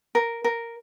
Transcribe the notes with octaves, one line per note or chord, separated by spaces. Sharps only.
A#4
A#4